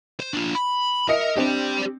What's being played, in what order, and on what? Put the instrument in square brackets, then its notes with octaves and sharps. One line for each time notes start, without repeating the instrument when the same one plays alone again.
[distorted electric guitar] C5
D4 F4
B5
[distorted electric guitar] A#4 [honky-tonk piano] D#5 E5 C#7
[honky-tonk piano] C4 D4 [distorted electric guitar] G4 D5